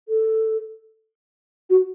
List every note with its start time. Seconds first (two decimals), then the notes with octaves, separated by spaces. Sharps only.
0.09 A4
1.70 F#4